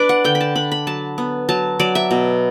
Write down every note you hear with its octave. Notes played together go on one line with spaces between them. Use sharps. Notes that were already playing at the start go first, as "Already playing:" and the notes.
Already playing: D4 B4 D5
F#5
D3 G5
B5
A5
D4 B5
B5
F#3 A5
B3
F#3 A5
F#3 D5
E5
B2